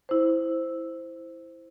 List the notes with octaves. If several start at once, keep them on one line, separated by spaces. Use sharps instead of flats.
E4 C5